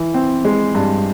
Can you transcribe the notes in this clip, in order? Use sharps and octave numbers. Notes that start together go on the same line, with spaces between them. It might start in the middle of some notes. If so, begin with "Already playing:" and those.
Already playing: E3
C4
G#3
G2